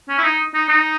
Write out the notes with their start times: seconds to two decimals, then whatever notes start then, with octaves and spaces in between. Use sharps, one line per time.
0.09 C#4
0.18 E4
0.24 D#4
0.54 D#4
0.69 D#4